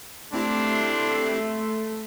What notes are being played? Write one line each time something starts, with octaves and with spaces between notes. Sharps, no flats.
A3 C4 D4 E4 G4 C6